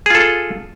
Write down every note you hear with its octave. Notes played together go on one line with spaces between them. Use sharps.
F4 G#4 A4